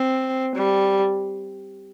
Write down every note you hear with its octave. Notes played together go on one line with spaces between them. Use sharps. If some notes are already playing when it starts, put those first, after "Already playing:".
Already playing: C4
G3